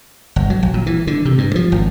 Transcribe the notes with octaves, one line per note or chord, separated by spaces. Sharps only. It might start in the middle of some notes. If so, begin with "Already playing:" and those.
G1
F#3
A#1
A#2
E3
D3
C3
G2
F3
G#1